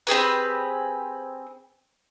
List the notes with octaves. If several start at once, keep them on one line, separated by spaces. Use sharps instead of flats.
C4 G4 G#4 B4